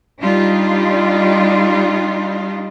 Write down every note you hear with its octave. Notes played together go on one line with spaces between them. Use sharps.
G3 D4 D#4 F4